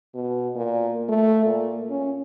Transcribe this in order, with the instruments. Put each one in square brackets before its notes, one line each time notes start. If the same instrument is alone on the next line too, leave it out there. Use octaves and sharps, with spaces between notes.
[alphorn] B2
A#2
A3
A#2
C#4